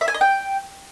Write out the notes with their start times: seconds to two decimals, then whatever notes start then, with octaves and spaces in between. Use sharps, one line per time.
0.01 E5
0.08 G#5
0.14 D#5
0.21 G5